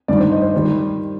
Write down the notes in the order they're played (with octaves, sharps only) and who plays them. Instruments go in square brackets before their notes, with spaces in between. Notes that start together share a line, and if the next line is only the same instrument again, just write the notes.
[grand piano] G2 D#3 G3 D5
C5
D#5
C5
D#3 G3